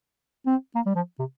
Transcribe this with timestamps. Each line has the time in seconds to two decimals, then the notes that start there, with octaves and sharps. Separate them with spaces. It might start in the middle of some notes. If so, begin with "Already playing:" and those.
0.46 C4
0.75 A#3
0.86 G3
0.95 F3
1.19 C3